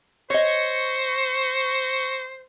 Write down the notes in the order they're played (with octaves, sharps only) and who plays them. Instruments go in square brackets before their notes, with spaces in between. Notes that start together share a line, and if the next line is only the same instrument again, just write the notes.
[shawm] C5 [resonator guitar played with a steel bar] C#5 D#5 [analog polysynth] C#6 A#6